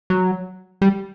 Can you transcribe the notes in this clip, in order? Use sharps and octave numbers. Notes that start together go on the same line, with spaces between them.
F#3
G3